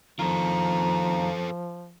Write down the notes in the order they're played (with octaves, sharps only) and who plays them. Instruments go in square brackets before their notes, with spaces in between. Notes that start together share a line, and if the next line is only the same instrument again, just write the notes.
[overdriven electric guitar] F2 D#3 [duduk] F3 [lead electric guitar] F4 A4 [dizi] A#5